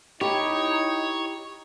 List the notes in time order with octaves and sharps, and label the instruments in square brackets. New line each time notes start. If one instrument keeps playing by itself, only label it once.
[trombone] D#4 [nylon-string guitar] E4 G5 [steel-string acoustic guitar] G4 [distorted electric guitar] C#5